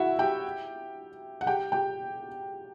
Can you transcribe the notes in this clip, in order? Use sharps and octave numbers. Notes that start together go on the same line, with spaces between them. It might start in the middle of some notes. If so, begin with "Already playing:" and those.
Already playing: E4 F#4 E5 F#5
G4 G5
F#5
G4 G5
G4 G5